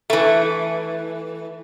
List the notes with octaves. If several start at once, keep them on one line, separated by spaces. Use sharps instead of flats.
E3 A3